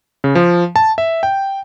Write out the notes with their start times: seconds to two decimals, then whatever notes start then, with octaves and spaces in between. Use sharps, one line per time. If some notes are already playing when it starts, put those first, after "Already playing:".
0.24 C#3
0.35 F3
0.76 A5
0.98 E5
1.23 G5